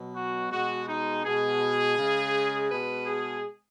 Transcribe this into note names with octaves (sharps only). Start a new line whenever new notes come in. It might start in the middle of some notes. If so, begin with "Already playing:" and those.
Already playing: B2 F#3
F#4
B2 G#3 F#4
D#4
B2 G#3 G#4
C#3 G#3
B2 G#3 B4
G#4